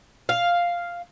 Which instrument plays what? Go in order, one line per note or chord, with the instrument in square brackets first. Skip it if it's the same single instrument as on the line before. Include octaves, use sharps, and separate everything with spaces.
[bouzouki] F5